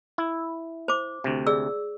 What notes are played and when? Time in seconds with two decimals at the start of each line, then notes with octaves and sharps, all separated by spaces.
0.18 E4
0.88 C5 D6
1.24 D2 C3
1.47 G#4 D5 E6